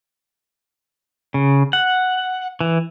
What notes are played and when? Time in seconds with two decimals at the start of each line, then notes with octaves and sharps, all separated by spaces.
1.34 C#3
1.73 F#5
2.61 E3